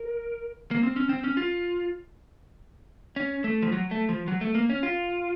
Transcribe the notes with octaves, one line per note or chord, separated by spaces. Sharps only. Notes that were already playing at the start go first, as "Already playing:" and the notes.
Already playing: A#4
A#3
C4
C#4
C4
C#4
F4
C#4
A3
F3
F#3
A3
F3
F#3
A3
A#3
C#4
F4